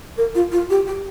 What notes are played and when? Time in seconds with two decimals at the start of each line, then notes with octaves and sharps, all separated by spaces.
0.18 A#4
0.35 F4
0.52 F4
0.70 G4
0.87 G4